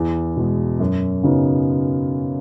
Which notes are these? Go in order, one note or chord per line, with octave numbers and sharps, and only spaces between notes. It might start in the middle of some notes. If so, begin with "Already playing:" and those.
Already playing: E2
B2 G#3
F#2
C#3 F#3 B3 D#4